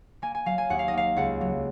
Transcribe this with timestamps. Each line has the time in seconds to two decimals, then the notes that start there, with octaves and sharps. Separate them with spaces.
0.22 A#3 G#5
0.35 G#5
0.46 F#3 F5
0.58 G#5
0.70 D#2 F#5
0.79 F5
0.88 D#5
0.93 A#3 F5
1.16 C#2 F#5
1.41 F#3